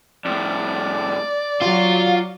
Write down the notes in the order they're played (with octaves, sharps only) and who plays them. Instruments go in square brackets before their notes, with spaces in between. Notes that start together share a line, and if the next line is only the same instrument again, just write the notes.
[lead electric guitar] F2 A2 [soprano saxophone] D5
[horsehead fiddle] F#3 F#4 [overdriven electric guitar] F4 [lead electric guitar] F5